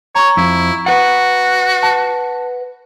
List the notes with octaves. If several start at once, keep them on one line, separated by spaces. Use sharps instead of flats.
C#5 A#5 C#6
F2 E4
F#4 B4 F#5
A5